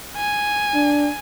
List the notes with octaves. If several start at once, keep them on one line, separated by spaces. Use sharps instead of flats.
G#5
D4